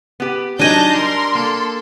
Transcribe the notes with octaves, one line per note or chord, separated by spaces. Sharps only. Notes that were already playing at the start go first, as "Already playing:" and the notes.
B3 G4
F#3 D4 D#4 G#5 A5 G6 A#6
G3 A#4 C6
A#3 A4